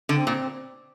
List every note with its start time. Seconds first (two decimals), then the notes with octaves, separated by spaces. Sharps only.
0.09 D3
0.15 C4
0.27 A#2